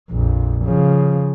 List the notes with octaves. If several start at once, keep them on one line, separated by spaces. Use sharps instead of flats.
A#1 F2
C#3 F3